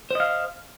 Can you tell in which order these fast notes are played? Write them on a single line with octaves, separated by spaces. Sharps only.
C5 D#5 F5